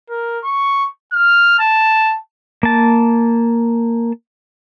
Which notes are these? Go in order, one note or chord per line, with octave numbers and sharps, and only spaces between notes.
A#4
C#6
F6
A5
A#3 A5